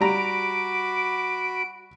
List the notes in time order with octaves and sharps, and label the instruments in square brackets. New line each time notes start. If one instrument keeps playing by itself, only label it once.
[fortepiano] G3 A#5 [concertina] F#4 B5 [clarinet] D6 [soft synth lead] D7